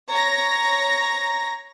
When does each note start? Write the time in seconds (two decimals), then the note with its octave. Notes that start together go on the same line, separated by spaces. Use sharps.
0.10 C#5 A#5 A#6